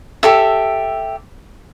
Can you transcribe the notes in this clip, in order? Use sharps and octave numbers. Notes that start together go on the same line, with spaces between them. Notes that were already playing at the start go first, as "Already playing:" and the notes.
G4 A4 E5